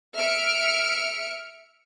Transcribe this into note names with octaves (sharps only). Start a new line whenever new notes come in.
E5 F6 C#7 D7